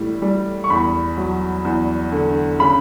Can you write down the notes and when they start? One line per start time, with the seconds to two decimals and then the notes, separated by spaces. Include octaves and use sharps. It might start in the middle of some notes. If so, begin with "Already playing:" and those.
Already playing: A2 E3 G3
0.22 G3
0.64 C#6
0.70 E2 B5
1.17 F#3
1.65 E2
2.12 D3
2.59 C#3 B5